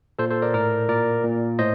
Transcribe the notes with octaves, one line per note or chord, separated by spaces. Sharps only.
A#2 A4 C5
A4 C5
A#4 D5
A2 A#4 D5
A#2 A#4 D5
A#2
A2 C5 D#5